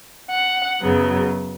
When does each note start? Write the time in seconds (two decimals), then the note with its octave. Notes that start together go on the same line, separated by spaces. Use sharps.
0.30 F#5
0.81 F#2 C#3 F#3 B3